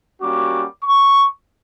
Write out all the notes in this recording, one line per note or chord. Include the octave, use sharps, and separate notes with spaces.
G3 A#3 C#4 F#4 D6
C#6